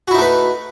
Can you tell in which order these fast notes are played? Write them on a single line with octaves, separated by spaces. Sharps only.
F#4 E4 D#4 A3 B4